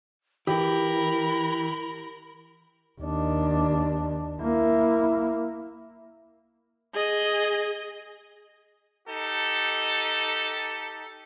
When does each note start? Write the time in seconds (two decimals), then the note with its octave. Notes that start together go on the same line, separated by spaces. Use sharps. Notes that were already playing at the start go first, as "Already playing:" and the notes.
0.47 E3 G4 A#4 B5
3.01 D#2 D4
4.41 A#3 E4
6.94 G#4 D#5
9.08 D#4 G4 A4